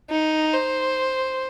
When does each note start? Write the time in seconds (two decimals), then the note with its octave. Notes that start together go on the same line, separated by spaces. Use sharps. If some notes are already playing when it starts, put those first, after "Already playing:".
0.10 D#4
0.53 C5